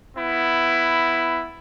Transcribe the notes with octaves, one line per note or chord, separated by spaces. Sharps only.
B3 E4